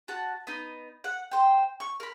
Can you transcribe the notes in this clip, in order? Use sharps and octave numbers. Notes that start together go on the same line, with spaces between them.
F#4 A5
B3 D#4
F#5
C5 G5
C#6
A#4 B5